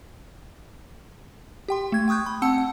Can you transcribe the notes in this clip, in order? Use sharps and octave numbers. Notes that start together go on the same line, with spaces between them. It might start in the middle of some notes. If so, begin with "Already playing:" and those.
G4 G5 C6
A3 G#6
G5 C#6 D#6 F#6 G6
B5
C4 F#5 A5 E6 C#7
F#5